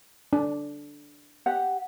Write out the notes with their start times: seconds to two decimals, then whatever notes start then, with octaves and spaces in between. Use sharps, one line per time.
0.33 D4
1.46 G4 F#5